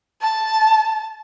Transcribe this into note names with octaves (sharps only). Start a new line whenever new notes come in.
A5